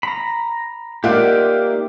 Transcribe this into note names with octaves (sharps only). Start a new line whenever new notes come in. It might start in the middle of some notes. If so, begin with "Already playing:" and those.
A#5 B5
A#3 D#4 F4 G4 D5 E5 F#5